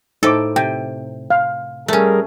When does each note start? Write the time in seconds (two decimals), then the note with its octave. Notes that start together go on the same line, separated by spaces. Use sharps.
0.23 A2 D#4 A4 C5 D6
0.56 C3 G5
1.30 F5
1.88 G3 A3 C#4 G#4 A#4